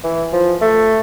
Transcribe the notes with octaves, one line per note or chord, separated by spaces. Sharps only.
E3
F3
A3